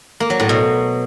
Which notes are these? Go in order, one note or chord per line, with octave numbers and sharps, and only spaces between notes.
A#3
F#3
A2
B2